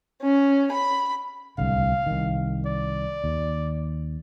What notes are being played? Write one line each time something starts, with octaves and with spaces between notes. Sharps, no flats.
C#4
B5
D1 C2 D3 F5
C2 D#3
D5
D#2